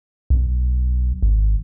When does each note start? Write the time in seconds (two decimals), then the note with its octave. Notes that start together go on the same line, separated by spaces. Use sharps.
0.30 B1
1.23 G#1